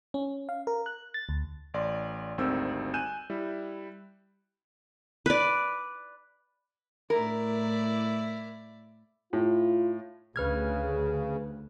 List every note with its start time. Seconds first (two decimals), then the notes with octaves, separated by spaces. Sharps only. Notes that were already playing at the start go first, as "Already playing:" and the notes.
0.14 C#4
0.49 F5
0.67 A#4
0.86 F#6
1.14 A6
1.29 D2
1.74 A1 D5 C6
2.38 G#1 D2 D#3 G3 C4 E6
2.94 G#5 F#6 G6 D#7 E7
3.30 G3 E4
5.26 B4 D5
7.10 A2 E4 A#4 D5
9.33 A2 F4
10.36 D2 C#3 B4 F6 G#6